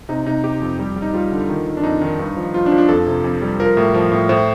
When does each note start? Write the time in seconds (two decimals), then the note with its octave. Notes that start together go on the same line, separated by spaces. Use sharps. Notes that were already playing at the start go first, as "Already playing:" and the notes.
0.09 C3 D#4
0.26 C3 D#4
0.44 C3 G4
0.62 F2
0.79 G3
0.96 G3
1.02 D#4
1.14 G3 F4
1.32 D3
1.49 D#3
1.67 D#3
1.77 D4
1.83 F2 D#4
2.01 D#3
2.19 G2
2.37 F3
2.54 F3 F4
2.66 D4
2.72 F3
2.78 D4
2.89 F2 A4
3.07 C3
3.24 F2
3.42 G3
3.60 F3 A#4
3.77 A2
3.94 F3
4.12 A2
4.29 A2 C5